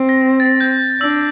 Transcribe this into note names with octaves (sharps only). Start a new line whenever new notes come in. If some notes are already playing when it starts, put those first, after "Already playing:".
Already playing: C4
A#6
A6
G6
D4 E6